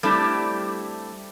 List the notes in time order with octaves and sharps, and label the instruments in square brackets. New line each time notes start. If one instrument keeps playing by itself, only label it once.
[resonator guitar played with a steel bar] G3 A3 C4 D4 E4 G4